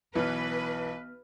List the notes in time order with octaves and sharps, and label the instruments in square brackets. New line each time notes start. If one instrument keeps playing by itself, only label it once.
[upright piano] B1 E3 [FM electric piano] B3 F6 [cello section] B4